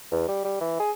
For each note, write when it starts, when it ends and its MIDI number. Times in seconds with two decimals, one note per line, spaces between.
0.12 0.27 40
0.28 0.41 55
0.45 0.61 55
0.61 0.75 52
0.80 0.92 68